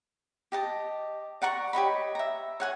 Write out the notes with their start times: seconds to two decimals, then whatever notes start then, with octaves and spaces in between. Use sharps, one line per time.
0.52 G4 D#5 A5
1.42 D5 F#5 A#5 C#6
1.73 G4 C#5 D#5 B5
2.15 E5 A#5
2.60 C#5 F#5 G#5